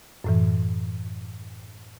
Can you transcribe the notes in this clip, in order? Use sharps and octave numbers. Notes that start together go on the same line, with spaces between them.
F#2 A2 E3